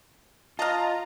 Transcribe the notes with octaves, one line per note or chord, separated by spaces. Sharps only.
F4 D#5 F5 A5 A#5